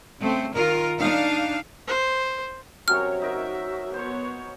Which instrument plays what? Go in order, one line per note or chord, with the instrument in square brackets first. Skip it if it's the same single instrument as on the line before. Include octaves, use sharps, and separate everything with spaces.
[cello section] C#3 A3 C4
D#3 F4 A#4
D4 D#4 F5
[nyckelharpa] C5
[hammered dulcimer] C3 F#3 C#4 [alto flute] F#4 [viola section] A#4 C#5 [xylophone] F6
[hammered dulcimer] D#4 A#4 C#5 [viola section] E5
[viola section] B3 C#5 [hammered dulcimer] C5